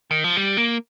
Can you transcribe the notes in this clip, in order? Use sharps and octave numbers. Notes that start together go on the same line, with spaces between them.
D#3
F3
G3
A#3